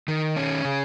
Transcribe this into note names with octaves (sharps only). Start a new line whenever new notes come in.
D#3
C#4
C#3